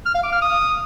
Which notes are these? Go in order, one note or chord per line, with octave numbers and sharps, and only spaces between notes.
F6
F5
D6
F6
D#6